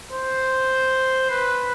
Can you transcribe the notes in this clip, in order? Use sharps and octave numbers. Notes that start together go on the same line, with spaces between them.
C5
B4